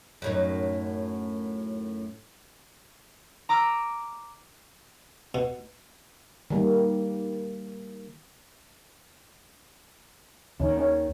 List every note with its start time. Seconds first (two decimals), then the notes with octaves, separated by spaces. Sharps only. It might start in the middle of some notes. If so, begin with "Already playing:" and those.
0.22 F#2 A2 D#4
3.49 A#5 D6 E6 F6
5.35 B2
6.50 D#3 G3 A#3
10.60 D#2 D#3 C#4
10.77 C#4